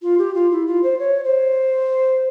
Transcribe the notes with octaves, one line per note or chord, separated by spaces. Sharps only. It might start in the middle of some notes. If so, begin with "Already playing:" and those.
F4
G4
F4
E4
F4
C5
C#5
C5